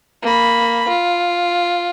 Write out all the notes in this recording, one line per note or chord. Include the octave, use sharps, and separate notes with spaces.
A#3 B5
F4